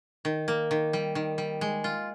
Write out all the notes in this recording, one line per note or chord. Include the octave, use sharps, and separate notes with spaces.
D#3
A#3
D#3
G3
D#3
G3
G#3
F4